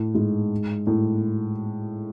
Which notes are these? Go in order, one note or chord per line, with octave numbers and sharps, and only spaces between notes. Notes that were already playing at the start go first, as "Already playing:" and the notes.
Already playing: A2
G#2
A2